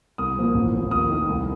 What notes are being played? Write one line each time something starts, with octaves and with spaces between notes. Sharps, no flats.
C2 D#6
A#2 F3 A#3
A1
A2 F3
D#2 D#6
D#3 A3
C2